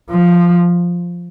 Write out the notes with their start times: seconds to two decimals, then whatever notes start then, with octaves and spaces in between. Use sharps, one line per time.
0.11 F3